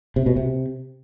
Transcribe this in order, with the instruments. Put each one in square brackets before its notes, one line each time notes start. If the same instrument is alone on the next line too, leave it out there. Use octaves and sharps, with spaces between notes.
[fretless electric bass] C3
B2
C3